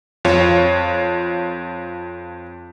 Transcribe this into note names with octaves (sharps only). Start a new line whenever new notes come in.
F2 F4 C#5